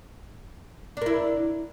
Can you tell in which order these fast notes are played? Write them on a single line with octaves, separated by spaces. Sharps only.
D4 A#4 E4